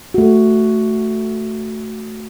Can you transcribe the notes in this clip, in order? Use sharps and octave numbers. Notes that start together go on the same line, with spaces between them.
A3 F#4